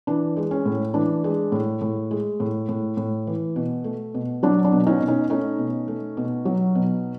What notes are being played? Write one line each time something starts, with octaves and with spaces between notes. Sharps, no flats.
E3 D4
G#3
C#4
A2
E3 D4
G#3
A2
A2
G#3
A2
A2
A2
E3
B2
A3
B2
F#3 D4
D4
B2
C#4 D#4
B2
C#4 D#4
A3 C#4 D#4
B2
A3
B2
F#3
B2